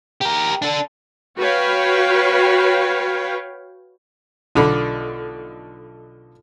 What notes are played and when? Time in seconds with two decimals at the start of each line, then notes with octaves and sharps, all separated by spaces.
0.21 G4 A#4
0.62 D4 A4
1.38 F#4 B4 C#5 F5 G5
4.55 B1 D3 F4 A4 D5 B5